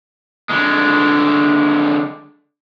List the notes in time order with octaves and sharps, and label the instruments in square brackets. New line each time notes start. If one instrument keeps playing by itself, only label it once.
[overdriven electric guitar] D3 G#3